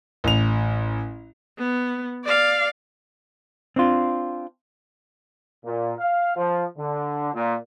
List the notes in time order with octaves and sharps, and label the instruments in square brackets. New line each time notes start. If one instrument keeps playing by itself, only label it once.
[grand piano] A1 F7
[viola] B3
D5 F5
[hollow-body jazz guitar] C4 D4 F4
[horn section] A#2
F5
F3
D3
A#2